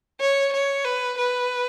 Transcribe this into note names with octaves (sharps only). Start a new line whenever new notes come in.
C#5
C#5
B4
B4